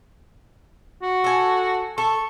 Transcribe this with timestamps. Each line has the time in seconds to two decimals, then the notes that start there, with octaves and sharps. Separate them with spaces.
1.03 F#4
1.24 A4 G#5
1.98 A4 C#6